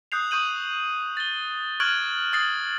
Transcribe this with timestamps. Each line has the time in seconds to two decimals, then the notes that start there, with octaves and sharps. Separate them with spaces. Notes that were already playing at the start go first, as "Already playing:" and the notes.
0.12 D#6 F#6 G6 C7 F7
0.31 C#6 D#6 G6 D#7 F#7
1.17 A6 G7
1.80 C#6 F6 F#6 G#6 D7 F#7
2.33 D#6 A6 C7 F#7